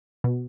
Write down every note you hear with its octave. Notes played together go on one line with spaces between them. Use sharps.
B2